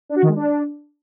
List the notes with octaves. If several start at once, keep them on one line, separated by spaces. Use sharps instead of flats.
D4
F#4
D#3
G#3
D4